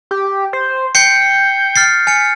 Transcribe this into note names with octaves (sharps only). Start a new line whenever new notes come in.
G4
C5
G5 G6 C7 C#7
F6 A6 C7
G#5 B6 C#7